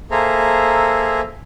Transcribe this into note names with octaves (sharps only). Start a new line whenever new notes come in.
A#3 G#4 A4 C5 E5 A#5